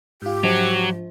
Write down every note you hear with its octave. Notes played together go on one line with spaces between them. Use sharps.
G#2 F4 G4
F3 F#3 C5